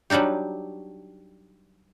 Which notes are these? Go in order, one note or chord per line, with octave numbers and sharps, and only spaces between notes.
F#3 G3 D4 D#4 G4